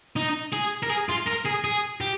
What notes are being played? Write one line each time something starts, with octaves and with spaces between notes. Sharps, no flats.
D#4
G#4
A#4
G#4
F4
A#4
G#4
G#4
G4